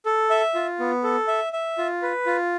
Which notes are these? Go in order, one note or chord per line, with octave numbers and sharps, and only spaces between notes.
A4
E5
F4
B3
A4
E5
E5
F4
B4
F4